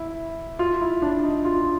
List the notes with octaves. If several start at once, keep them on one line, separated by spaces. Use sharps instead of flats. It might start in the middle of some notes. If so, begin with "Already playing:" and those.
Already playing: E4
F4
E4
D4
D#4
F4